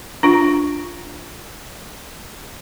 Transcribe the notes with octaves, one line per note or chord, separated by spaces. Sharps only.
D4 F4